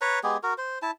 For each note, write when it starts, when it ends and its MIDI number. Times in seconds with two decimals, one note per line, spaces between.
0.01 0.19 71
0.01 0.19 73
0.01 0.19 82
0.23 0.37 56
0.23 0.37 59
0.23 0.37 67
0.23 0.37 68
0.43 0.54 66
0.43 0.54 70
0.58 0.79 72
0.82 0.91 64
0.82 0.91 81